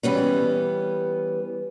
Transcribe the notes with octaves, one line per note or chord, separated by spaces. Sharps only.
E3 G3 B3 C#4